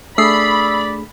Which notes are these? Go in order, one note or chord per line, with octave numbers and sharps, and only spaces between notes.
A3 D4 G#4 D5 B5 D#6 E6 C7